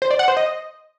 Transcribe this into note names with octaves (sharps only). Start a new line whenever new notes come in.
C5
D5
F#5
C5
D#5